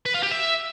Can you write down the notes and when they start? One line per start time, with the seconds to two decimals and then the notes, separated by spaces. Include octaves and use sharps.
0.06 B4
0.14 F4
0.23 G4
0.31 E5